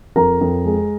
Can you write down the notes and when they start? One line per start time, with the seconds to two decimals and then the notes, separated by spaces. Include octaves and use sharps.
0.16 F2 A#4 A#5
0.41 F2
0.66 G#3